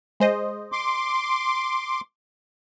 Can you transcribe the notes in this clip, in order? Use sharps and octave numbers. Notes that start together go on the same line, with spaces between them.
G#3 C5 D#5
C6 D6